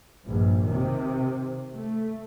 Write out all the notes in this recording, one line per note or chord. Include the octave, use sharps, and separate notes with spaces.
A#1 G2
C3 D#3
A3